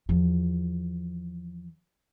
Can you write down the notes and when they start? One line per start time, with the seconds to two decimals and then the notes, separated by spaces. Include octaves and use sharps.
0.09 E2 F3